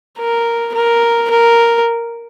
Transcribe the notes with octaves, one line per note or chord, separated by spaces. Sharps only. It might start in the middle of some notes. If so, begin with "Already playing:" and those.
A#4
A#4
A#4